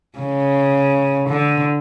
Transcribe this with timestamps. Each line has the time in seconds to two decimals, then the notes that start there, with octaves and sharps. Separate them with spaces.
0.19 C#3
1.28 D3